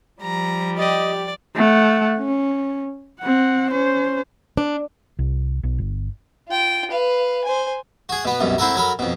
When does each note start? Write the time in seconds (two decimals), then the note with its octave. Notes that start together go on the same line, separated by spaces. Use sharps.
0.21 F3 G3 A#5
0.78 G4 D5 D#5
1.56 A3 F#5
2.18 C#4
3.20 C4 F#5
3.71 C#4 C5
4.57 D4
5.19 C2
5.63 B1
5.78 G1
6.48 F4 G5
6.90 B4 F5
7.44 C5 G#5
8.09 F#4 G#4
8.25 B2 B3
8.40 C2 F#2 B2
8.58 C4 E4 F#4 A4 A#4
8.75 F#3 A4 A#4 B5
8.99 F2 B2